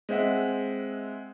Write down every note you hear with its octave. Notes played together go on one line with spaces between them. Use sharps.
G#3 C4 E5 F#5